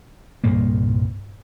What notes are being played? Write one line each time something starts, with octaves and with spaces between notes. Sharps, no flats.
C2 G2 A#2 A#3